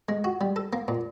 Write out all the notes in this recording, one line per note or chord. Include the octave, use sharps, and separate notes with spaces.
G#3
F#4
G3
A4
A#3
A#2